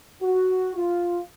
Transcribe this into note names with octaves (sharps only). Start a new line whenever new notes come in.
F#4
F4